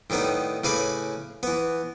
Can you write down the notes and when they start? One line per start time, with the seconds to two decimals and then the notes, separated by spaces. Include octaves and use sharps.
0.10 A2 D#3 G3 B3 D#4
0.64 A2 C#3 B4 G#5 B5 D6
1.43 E3 B3